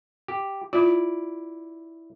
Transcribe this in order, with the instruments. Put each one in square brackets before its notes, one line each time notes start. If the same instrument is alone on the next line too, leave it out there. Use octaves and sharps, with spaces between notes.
[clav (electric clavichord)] G4
[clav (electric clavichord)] E4 D5 [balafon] F4